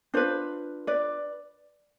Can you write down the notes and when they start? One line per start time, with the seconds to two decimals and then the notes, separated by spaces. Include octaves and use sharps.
0.14 D4 F4 B4 C5
0.87 B4 D5